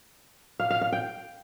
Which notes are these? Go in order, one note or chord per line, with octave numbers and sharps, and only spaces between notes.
F5
F5
F5
G5